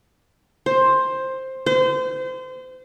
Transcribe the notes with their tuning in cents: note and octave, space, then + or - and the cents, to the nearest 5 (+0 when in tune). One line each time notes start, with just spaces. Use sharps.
C5 +10
C5 -30